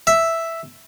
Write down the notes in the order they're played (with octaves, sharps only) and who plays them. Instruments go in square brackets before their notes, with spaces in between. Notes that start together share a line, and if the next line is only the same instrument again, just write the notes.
[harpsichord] E5